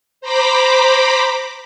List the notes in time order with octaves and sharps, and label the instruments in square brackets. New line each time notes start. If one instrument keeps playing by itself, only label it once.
[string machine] C5 A#5 B5 D6 B6